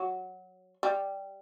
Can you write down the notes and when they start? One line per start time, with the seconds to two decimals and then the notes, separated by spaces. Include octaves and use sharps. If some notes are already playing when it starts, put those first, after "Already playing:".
Already playing: F#3
0.83 G3